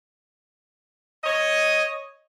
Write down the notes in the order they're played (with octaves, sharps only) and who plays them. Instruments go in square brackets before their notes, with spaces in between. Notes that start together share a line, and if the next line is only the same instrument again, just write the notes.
[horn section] C#5 D#5